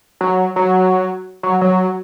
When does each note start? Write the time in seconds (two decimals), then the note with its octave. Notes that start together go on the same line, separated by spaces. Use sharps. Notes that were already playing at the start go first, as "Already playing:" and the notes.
0.21 F#3
0.56 F#3
1.43 F#3
1.61 F#3